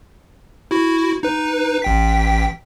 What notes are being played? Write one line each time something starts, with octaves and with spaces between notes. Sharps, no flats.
E4 F#4
D#4 B4
A1 G5 B6